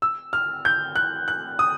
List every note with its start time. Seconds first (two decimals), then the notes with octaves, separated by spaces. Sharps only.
0.02 E6
0.33 F6
0.65 G6
0.95 F#6
1.28 F#6
1.59 D#6